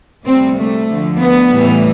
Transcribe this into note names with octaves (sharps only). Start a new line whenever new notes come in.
D2 C3 G3 C4
A3
D2 D3 F3
B3
A2 E3 G3